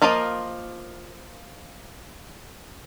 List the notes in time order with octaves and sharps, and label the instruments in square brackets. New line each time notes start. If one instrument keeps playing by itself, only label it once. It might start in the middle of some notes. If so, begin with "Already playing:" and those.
[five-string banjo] F3 A#3 F4 A#4 D#5